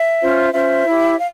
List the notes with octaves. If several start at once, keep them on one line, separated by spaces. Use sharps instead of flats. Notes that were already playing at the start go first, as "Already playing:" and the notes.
Already playing: E5
C#4 F4 C5
C#4 F4 C5 E5
E4 G4 C#5
F5